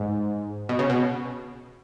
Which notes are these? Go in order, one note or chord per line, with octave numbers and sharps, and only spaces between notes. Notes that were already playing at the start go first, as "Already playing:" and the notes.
Already playing: G#2
B2
C#3
B2